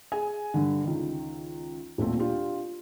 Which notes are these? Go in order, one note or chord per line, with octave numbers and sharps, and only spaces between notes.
G#4 G#5
G2 D3
C#2 D#3
D#1 A#2 A3 C4
D4 F4 G4